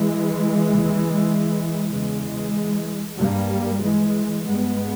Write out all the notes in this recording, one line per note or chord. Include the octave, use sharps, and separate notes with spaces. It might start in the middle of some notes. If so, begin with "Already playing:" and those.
Already playing: E3 G#3
D#2 C#3
E2 C#3 E3 G#3
G2 G3 A#3
E3 G#3
G2 G#3 B3